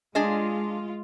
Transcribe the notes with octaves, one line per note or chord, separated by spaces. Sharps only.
G#3 D4 F4 G#4 D#5